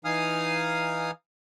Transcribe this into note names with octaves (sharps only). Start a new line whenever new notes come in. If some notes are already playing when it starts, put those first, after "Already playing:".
E3 D#4 F5 G#5 D#6 F6